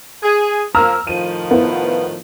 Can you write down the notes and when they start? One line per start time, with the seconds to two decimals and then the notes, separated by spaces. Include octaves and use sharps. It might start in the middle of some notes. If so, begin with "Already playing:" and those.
0.23 G#4
0.75 F3 A#3 A#5 E6 F6
1.07 A2 D#3 F3 D#7
1.51 B3 E4